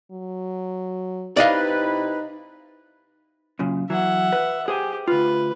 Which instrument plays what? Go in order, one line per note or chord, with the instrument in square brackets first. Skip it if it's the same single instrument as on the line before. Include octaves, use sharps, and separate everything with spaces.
[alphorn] F#3
[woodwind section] C3 E4 B4 [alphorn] D#4 [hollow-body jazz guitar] D5 D#5 F5
[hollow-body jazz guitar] F#2 A#2 C#3
[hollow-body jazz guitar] E3 F#3 [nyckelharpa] E5 F#5
[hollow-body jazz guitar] B4
[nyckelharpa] G4 [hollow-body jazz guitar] G#4 C5 G#5
[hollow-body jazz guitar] D2 F4 [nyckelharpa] B4